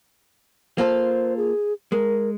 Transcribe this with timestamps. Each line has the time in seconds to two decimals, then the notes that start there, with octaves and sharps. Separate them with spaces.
0.78 A#3 F4 A4 C5
1.37 G#4
1.92 G#3 A#4